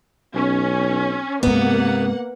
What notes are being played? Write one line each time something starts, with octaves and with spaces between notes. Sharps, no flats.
B1 C#4
G2 C3 G#3 A#3 B3 F#5